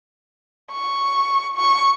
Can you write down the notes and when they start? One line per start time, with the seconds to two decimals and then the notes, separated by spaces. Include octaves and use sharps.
0.71 C#6
1.56 C#6